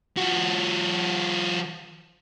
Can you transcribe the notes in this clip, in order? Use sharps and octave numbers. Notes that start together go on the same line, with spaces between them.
F3 F#4